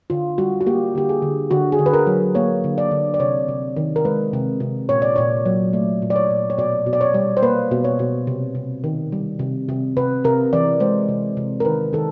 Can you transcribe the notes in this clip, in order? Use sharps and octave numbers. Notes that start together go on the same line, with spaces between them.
D3 F4
G3 F#4
F#4
A#3 G4
D3 G4
G#4
D3
D3 F#4
G#4
D3
B4
A#4
F#3
A#3 C#5
D3
D5
D3
D5
C3 C#5
C3
D#3
A#4
G#3 B4
C3
C3
A#2 C#5
D5
A#2 C#5
F#3
A3 D5
A#2
D5
C#5
A#2
C#5
B2 D5
B2
D5
C#5
G3
C5
A#3 B4
B2
C#5
B2
C3
C3
D#3
G3
C3
C3
C3 B4
C3 A#4
E3 D5
G#3 C5
C3
C3
A#4
D#3 B4
D#3 A4